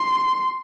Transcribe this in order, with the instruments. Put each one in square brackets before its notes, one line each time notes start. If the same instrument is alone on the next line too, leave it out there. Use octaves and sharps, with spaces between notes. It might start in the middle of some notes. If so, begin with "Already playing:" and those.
Already playing: [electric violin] C6